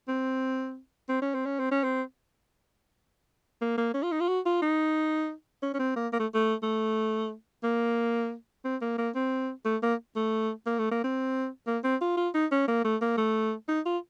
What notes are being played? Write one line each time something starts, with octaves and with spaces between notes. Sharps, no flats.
C4
C4
C#4
C4
C#4
C4
C#4
C4
A#3
A#3
C#4
F4
D#4
F4
F#4
F4
D#4
C#4
C#4
C4
A#3
A#3
A3
A3
A3
A#3
C4
A#3
A#3
C4
A3
A#3
A3
A#3
A3
A#3
C4
A#3
C4
F4
F4
D#4
C#4
A#3
A3
A#3
A3
D#4
F4